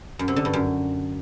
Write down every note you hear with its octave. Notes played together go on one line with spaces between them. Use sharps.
F#2
C3
D3
G2
F#2